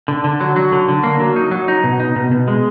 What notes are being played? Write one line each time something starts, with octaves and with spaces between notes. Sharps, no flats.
D3
D3
F#3
F#3
D3
D3
A#3
F#3
D#4
F#3
D#4
B2
D#4
B2
B2
G#3